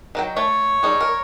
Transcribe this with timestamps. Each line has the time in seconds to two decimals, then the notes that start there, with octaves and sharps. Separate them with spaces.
0.15 D#3 F#3 G5
0.37 A3 C#5
0.83 G3 D#4 G#4
1.01 A#4